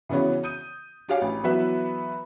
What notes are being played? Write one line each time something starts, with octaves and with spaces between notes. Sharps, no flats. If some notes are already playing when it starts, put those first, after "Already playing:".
C#3 E3 B3 C#4 F#4
D#6 G6 D#7
D4 F#4 G4 C#5 F5 G#5
A1
E3 F#3 B3 F#4 B4 E5